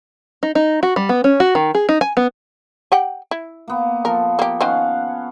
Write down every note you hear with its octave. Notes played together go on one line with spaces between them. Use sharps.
D#4
D#4
F#4
G3
B3
C#4
F#4
D#3
G#4
D#4
G#5
B3
G4 F#5 G5
E4
A#3 B3
F3 A4 A#4
A#3 G4
D#3 C#4 C5 F5 F#5